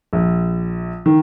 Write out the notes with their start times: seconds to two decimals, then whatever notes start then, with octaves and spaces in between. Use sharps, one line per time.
0.13 A#1
1.06 D#3